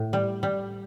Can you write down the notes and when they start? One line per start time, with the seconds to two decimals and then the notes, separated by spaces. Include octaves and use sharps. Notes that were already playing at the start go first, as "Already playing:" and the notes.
Already playing: A2
0.13 G3
0.43 G3